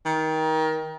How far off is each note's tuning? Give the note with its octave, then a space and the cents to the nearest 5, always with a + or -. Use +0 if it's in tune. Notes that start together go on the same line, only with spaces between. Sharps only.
D#3 +25